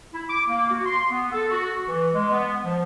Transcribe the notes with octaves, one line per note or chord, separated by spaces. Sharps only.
E4
D6
A#3
F#4
C6
B3
A4
F#4
E3
G#3
B3
F3